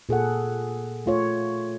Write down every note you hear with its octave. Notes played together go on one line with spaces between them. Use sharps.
A#2 G#4 A4 F#5
A3 F4 C#5